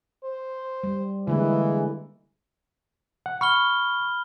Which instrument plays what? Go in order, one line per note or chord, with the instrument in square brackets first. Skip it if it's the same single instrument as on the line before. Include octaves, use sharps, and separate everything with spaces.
[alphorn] C5
[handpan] G3
[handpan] D3 G#3 A#3 [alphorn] E3
[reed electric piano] F#5
[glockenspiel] B5 F6 G7 [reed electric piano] C#6